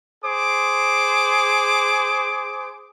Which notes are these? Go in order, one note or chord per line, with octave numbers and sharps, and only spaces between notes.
G#4 C5 D6